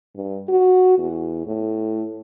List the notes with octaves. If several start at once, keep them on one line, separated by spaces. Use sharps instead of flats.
G2
F#4
E2
A2